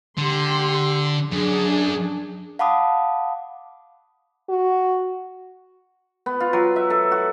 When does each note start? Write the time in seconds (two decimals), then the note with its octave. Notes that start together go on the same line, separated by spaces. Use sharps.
0.18 D3 G4 C6
1.31 F#2 D4 G#4
2.59 F5 F#5 A5 B5 D6 D#6
4.49 F#4
6.26 B3
6.40 F4
6.53 F#3
6.76 E5
6.90 A4
7.12 F#4